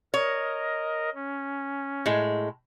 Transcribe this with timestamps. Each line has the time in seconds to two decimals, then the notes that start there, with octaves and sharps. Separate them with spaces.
0.14 A#4 C#5 D#5
1.15 C#4
2.06 A2 G#3